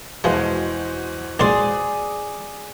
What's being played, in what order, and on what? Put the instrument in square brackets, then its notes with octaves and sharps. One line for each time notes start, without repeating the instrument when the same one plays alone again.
[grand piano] E2 B2 G#3 [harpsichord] E3 F3 [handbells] F#4 C5
[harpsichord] A#1 G#2 C6 [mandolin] G#4 D5